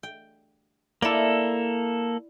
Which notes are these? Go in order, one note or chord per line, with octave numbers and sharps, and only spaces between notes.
G5
A#3 E4 A4 D5